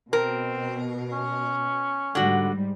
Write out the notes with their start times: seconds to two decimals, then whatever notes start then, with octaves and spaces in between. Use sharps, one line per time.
0.13 B2 C4 A#4
1.12 C#4
2.15 G#2 D3 G3 F#4